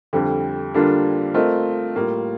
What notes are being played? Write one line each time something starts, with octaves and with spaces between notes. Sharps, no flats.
F2 D3 G3
D3 G3 A#3 D4 F4
A3 C4 F4 A#4 D#5
A2 G3 A#3 F4